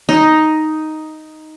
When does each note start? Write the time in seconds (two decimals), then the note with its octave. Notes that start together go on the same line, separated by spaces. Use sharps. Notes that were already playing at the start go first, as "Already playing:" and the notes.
0.09 D#4